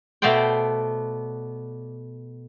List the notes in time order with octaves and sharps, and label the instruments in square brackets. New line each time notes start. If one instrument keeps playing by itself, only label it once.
[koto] B2 A3 B3 C5 D5 G5